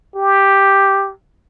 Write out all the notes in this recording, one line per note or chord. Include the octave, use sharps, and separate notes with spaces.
G4